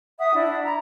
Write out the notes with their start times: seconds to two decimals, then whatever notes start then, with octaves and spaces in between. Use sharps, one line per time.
0.19 E5 F#5 D#6
0.34 D4 E4
0.64 A#5 B5